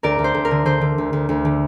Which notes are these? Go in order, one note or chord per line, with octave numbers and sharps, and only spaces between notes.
D2 A#4 D5
D2
C5
D2
A#4
D3
D3 C5
D3
D2
D2
D2
D3